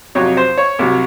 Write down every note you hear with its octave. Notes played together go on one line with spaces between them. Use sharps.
F2 C3 F#3 C#5
C5
C#5
C2 C3 F#3